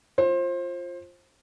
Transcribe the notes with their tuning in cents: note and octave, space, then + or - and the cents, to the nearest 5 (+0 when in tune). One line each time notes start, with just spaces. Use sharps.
F4 +0 C5 +25